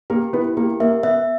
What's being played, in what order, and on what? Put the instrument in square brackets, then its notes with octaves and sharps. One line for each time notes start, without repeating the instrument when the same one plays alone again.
[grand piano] A#3 A#4 [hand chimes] G4
[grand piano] B3 B4 [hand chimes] E4
[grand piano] A#3 A#4 [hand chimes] G4
[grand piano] A#3 A#4 [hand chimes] E5
[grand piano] B3 B4 [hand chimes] E5